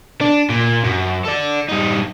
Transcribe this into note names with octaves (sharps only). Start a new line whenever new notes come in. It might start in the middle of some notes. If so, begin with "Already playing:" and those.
D4
A#2
F#2
A4 D5
G2 D#4